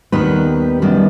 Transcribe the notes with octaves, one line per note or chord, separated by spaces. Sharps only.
D#2 D#3 G3 B3 G4 B4
F#2 D#3 G3 B3